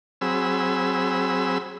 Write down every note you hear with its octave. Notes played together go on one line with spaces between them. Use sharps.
F#3 C4 G#4 B5 E6